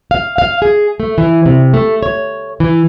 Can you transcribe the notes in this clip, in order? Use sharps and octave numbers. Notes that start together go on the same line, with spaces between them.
F5
F5
G#4
A3
E3
C3
A3
C#5
E3